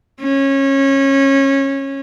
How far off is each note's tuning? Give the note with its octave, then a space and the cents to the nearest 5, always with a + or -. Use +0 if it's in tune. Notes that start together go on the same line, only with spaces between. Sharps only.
C#4 -20